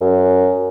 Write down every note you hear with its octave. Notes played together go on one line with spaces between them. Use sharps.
F#2